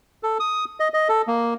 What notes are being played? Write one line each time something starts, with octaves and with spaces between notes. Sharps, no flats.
A4
D#6
D#5
D#5
A4
A#3